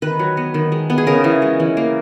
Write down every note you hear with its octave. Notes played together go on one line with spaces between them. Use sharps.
D#3 B4
F#3
B3
D#3
G#3
B3
G#4
C#3 A#4
E3
G#3
E3
A#3